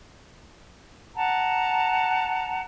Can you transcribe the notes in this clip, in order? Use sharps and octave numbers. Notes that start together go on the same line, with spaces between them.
F#5 A5 A#5